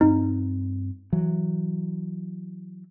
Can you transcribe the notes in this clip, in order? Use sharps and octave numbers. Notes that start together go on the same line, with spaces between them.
G2 C4 D#4
E3 F#3